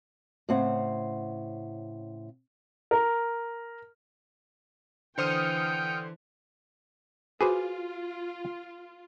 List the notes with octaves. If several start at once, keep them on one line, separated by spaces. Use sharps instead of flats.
A2 C#3 C4 F#5
A#4
D3 E3 C5 G5 D#6 F6 C#7
F4 F#4 G#4 B4 C5 D6